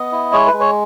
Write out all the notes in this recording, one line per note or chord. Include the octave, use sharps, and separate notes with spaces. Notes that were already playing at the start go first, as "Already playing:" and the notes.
Already playing: B3 D#5
E4
G#3 C#5
B4
G#3
C#5